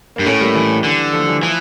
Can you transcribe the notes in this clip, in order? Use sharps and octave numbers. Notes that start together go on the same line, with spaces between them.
G2 A#3
A2 A3 C#4
G3 A#3
E3 G3
D3
F3 A3
E3 G3
E3 F3